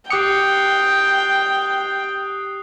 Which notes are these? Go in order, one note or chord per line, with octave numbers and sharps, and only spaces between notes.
G4 G5 D6 D#6 F#6 C7 C#7